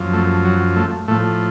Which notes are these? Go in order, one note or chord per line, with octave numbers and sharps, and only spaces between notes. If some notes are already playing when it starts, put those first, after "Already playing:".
Already playing: F#2 F3
A3
F#3
A3
A2 F3 A3